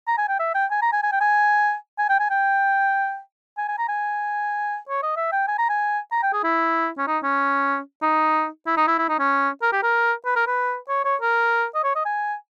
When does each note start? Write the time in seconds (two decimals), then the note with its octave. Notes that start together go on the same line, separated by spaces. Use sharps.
0.07 A#5
0.18 G#5
0.29 G5
0.39 E5
0.55 G5
0.71 G#5
0.82 A#5
0.93 G#5
1.03 G#5
1.12 G5
1.21 G#5
1.99 G#5
2.09 G5
2.19 G#5
2.30 G5
3.57 G#5
3.68 G#5
3.78 A#5
3.89 G#5
4.89 C#5
5.03 D#5
5.16 E5
5.32 G5
5.48 G#5
5.58 A#5
5.69 G#5
6.12 A#5
6.23 G5
6.33 G#4
6.43 E4
6.98 C#4
7.07 D#4
7.23 C#4
8.02 D#4
8.66 E4
8.77 D#4
8.87 E4
8.98 E4
9.09 D#4
9.19 C#4
9.62 A#4
9.72 G4
9.83 A#4
10.25 B4
10.36 A#4
10.47 B4
10.89 C#5
11.05 C#5
11.21 A#4
11.75 D#5
11.84 C#5
11.95 D#5
12.05 G#5